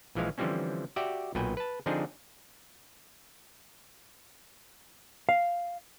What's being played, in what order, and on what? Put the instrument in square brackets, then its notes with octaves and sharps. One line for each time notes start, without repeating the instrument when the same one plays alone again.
[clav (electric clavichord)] A#1 E3 F3 G#3 F5
D3 E3 F3 G3 C4 C#4
F#4 G4 D5 E5 G5
B1 A#2 F#4 B4 G5 G#5
B4 A5
D3 F3 C4 D4 D#4 G#4
[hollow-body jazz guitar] F5